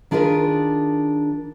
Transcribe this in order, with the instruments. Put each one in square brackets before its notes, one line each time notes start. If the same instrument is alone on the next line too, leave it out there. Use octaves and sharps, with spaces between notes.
[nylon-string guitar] D#3 D4 F4 G#4 A#4 B4